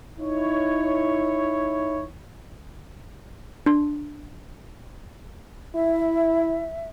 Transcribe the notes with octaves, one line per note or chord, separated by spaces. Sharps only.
D#4 E4 C#5
D4 C6
E4 E5